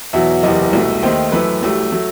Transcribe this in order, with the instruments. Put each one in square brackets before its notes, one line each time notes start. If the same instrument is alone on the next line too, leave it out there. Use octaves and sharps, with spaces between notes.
[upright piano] E2 B2 F#3 E5
F#1 E2 C3 D#5
C2 B2 A3
D#2 D#3 A3 C5
F#2 E3 A3 B4
C2 C3 F#3 A3
F#3 A3